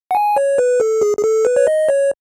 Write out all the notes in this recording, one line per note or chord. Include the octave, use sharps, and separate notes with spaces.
F#5
G#5
C#5
B4
A4
G#4
G#4
A4
B4
C#5
D#5
C#5